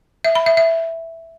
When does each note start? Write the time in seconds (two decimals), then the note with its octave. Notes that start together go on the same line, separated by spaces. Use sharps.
0.25 E5
0.35 B5
0.46 E5
0.57 E5